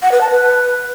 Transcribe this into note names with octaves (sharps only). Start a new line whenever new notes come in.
F#5
B4
A5
B4